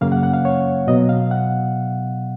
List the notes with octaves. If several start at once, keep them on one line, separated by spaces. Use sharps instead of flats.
F#2 C#3 F#3 A#3 C#4 F5
F#5
F#5
F5
C#5
B2 F#3 B3 D#5
F5
F#5